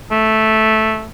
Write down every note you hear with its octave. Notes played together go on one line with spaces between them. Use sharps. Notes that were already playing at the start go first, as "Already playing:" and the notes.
A3